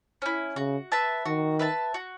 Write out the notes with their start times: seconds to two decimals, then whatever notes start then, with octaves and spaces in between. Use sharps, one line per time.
0.22 C#4 E4
0.56 C#3 F#4
0.92 B4 E5 A5
1.26 D#3 F#4
1.59 B4 E5 A5
1.94 F#4